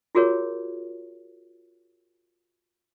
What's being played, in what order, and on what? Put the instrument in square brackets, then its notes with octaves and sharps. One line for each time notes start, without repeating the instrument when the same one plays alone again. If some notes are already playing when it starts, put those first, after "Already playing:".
[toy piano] F4 F#4 G#4 A#4 C#5